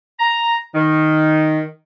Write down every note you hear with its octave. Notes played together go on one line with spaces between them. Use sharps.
A#5
D#3